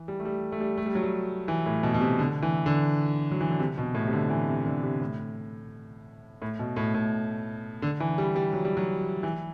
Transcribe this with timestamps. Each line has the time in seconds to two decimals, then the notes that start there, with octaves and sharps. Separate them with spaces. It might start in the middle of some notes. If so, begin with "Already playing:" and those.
Already playing: E3
0.08 G3
0.20 A3
0.25 G3
0.52 A3
0.60 G3
0.77 A3
0.86 G3
0.95 F#3
1.03 G3
1.48 E3
1.66 A2
1.83 B2
1.94 B2
2.01 C3
2.19 D3
2.43 E3
2.66 D3
3.31 F#3
3.41 E3
3.50 D3
3.60 C3
3.78 B2
3.95 A2
4.07 C3
4.13 D3
4.30 E3
4.48 C3
4.66 D3
4.83 C3
5.01 A2
6.42 A2
6.59 B2
6.76 A2
6.94 A2
7.82 D3
8.00 E3
8.18 G3
8.36 G3
8.53 F#3
8.65 G3
8.77 F#3
9.23 E3